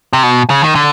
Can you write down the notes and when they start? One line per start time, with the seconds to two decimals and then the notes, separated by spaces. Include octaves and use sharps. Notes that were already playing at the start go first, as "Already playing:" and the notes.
0.13 C3
0.23 B2
0.50 C#3
0.63 D#3
0.75 D3